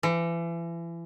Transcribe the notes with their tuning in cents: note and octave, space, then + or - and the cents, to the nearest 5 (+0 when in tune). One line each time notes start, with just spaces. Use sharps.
E3 +35